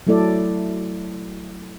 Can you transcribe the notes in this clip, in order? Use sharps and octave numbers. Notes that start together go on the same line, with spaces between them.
F#3 A3 E4 A4 D5